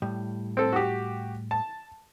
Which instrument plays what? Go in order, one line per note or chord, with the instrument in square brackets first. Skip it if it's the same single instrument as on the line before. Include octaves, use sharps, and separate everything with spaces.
[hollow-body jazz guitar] A2 G3
[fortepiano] C4 A4
F#4 G4
A5